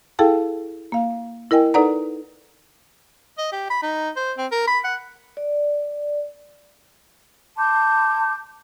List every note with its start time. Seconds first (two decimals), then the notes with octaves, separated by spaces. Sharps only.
0.19 E4 G#4 A4 F5 G5 A5
0.92 A#3 F5
1.51 E4 A#4 D#5 G5 G#5
1.74 D#4 A4 B4 D5 F#5 A#5
3.38 D#5
3.52 G4
3.70 B5
3.83 D#4
4.16 C5
4.38 C4
4.52 A#4
4.68 B5
4.84 F#5
5.37 D5
7.58 A5 C6 D6 G6